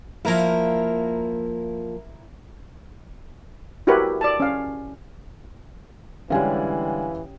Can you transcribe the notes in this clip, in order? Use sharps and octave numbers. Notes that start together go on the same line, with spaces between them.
F3 A#3 E4 A#4
E4 F#4 G4 A#4 B4 C#5
D5 A5
C#4 F5
D3 E3 G3 G#3 C#4 G4 F5 G#5